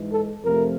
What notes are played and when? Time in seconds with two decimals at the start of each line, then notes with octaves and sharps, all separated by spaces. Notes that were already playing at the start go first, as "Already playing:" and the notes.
Already playing: G#2 E3 G#3
0.12 A4
0.45 F2 C3 F3 A3 A#4